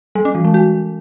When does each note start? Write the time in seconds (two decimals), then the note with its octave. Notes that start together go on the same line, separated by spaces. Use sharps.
0.15 G3
0.25 C#4
0.35 E3
0.45 G#3
0.54 F#4